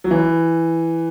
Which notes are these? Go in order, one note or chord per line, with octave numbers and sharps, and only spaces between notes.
F#3
E3